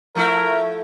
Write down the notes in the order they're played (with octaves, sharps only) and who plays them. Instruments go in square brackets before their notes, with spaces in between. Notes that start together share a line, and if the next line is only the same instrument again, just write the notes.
[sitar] F3 A3 E4 [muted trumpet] A#4